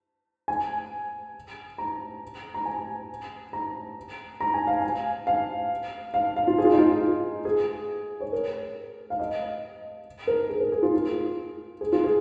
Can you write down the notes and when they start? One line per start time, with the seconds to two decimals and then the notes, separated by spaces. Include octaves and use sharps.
0.48 G#5
1.78 A#5
2.54 A#5
2.65 G#5
3.53 A#5
4.41 A#5
4.54 G#5
4.67 F5
4.81 G#5
5.27 F5
6.14 F5
6.36 F5
6.47 F4
6.58 G#4
6.64 F4
6.72 D#4
6.79 F4
7.45 G#4
8.20 C#5
8.32 A#4
9.10 F5
9.20 D#5
10.27 A#4
10.49 G#4
10.60 A#4
10.72 G#4
10.83 F4
10.94 F4
11.81 G#4
11.92 F4
12.04 G#4